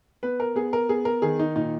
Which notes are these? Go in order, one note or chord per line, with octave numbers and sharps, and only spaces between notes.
B3 B4
A#4
B3 G#4
A#4
B3 G#4
A#4
D#3 G#4
D#4
A#2 D#4